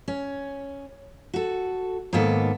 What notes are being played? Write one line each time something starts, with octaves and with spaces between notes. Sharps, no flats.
C#4
F#4 A4
G#2 D#3 A#3 B3 A4